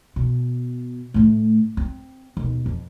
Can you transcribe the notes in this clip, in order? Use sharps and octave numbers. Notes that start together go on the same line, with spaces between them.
B2
A2 A3
C4
D#2 B2
F2